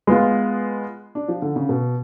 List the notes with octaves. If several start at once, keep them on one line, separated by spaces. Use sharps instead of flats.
G#3 B3 F4
D4
F3
D3
C#3
B2